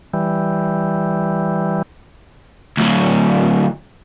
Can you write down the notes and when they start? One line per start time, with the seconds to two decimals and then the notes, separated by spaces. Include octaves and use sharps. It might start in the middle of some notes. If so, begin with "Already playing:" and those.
0.13 E3 G3
2.77 D2 F#3